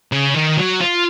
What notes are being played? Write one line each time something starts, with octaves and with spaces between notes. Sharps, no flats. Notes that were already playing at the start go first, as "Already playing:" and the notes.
C#3
D#3
F#3
F4